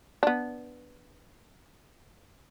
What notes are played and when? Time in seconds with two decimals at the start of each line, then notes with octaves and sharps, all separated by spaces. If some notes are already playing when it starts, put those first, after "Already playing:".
0.23 B3 D4